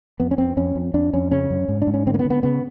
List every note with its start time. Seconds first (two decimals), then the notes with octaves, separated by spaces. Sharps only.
0.20 F2 B3
0.31 C#4
0.38 F2 C4
0.57 F2 C#4
0.76 F2
0.94 F2 D4
1.13 F2 C#4
1.31 C#3 C#4
1.50 F#2
1.68 G#2
1.82 D4
1.87 G#2
1.94 C#4
2.07 D3 C4
2.14 A#3
2.19 B3
2.25 D3
2.30 B3
2.43 C#3 B3